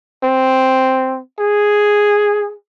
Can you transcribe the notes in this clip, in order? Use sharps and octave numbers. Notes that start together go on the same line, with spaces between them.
C4
G#4